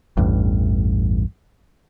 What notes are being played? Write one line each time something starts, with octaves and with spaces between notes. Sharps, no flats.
A1 E2 G2